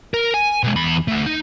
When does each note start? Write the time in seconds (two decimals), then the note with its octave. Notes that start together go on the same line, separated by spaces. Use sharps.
0.14 A#4
0.34 G#5
0.63 B2 G#3
0.76 E2 B5
1.08 D3 A3
1.26 D#4